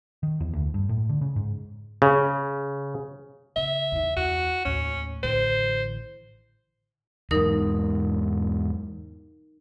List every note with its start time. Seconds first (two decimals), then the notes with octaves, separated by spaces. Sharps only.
0.23 D#3
0.40 E2
0.53 D2
0.74 G2
0.89 A2
1.09 D3
1.21 C#3
1.36 G#2
2.02 C#3
3.56 C#3 E5
3.92 E2 D#3
4.17 E2 F#4
4.65 D#2 A2 C#4
5.23 A1 D3 C5
7.31 E2 G#2 D#4 A#4 D#6